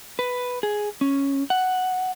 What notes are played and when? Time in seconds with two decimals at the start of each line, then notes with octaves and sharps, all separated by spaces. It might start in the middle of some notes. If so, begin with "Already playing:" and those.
0.19 B4
0.63 G#4
1.01 C#4
1.50 F#5